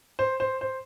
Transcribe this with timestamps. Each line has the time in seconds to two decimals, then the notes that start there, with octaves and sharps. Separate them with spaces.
0.19 C5
0.40 C5
0.61 C5